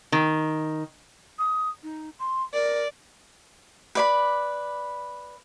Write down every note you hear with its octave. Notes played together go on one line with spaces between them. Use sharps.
D#3
D#6
D#4
C6
A#4 D5
B4 D5 B5